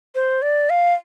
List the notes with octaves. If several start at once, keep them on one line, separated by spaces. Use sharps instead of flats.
C5
D5
F5